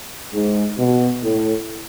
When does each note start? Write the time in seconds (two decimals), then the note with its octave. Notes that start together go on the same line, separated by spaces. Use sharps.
0.33 G#2
0.77 B2
1.22 A2